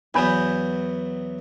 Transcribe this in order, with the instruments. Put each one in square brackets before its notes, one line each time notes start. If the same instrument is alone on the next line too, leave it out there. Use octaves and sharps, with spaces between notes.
[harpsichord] E2 F#3 B3 [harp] G#5 B5 G6